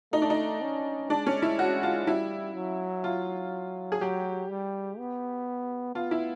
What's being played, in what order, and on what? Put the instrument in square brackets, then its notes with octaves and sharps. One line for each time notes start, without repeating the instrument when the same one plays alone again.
[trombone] A3 [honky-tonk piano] D#4
[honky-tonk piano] D4
D#4
[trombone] C#4
[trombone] G#3 [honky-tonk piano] D4
[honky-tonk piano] C#4
E4
F#4
F4
[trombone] G3 [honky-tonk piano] E4
[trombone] F#3
[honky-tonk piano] F4
G#4
[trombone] F#3 [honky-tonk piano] G4
[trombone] G3
B3
[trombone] B3 [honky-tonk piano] F4
[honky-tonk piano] E4